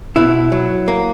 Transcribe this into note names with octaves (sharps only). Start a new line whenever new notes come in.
B2 E4
F#3
A#3